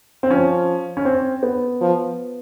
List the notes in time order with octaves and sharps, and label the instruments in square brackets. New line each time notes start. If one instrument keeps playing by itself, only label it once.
[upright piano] C4
[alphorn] F3 [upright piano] C#4
[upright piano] C#4
C4
B3
[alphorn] F3